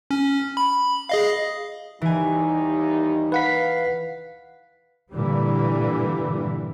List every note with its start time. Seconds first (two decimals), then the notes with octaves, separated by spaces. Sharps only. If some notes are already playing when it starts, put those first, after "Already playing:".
0.11 C#4
0.57 B5
1.09 G#4 D#5 F5
2.01 D#2 E3 G3 D#4 G#5
3.32 B4 F5 F#5 B6
5.11 G2 A#2 D3 E3 G3